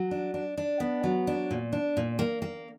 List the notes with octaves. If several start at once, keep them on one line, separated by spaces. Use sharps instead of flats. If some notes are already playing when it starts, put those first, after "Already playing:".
Already playing: F#3
D4
D4
D4
B3
F#3
D4
A#2
D4
A#2
A#3
A#3